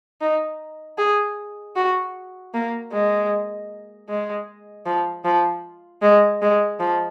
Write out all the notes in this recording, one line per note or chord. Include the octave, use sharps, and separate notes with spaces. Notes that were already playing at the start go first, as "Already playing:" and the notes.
D#4
G#4
F#4
A#3
G#3
G#3
F3
F3
G#3
G#3
F3